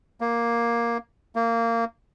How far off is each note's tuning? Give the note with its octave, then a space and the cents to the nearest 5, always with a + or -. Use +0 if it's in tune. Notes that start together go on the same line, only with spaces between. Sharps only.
A#3 +5
A#3 -20